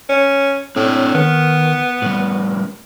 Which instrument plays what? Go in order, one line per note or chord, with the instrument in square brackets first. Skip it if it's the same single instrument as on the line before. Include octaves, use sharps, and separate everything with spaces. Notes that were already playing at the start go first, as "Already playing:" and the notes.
[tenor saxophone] C#4
[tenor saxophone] A2 [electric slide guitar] C4 D4 C#5
[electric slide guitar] D#3 [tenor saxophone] B3
[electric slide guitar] A2 G3